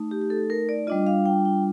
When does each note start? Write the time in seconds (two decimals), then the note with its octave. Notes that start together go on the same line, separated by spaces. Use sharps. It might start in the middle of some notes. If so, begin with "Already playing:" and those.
Already playing: A3 D#4
0.11 G4
0.21 G4
0.30 A4
0.50 A#4
0.69 D5
0.87 G3 D4 F4 D#5
1.07 F5
1.26 G5
1.45 G5